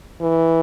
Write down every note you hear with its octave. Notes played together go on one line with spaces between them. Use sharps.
E3